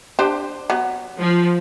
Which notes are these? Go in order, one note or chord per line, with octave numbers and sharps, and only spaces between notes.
D4 G4 C5
F#3 B3
F3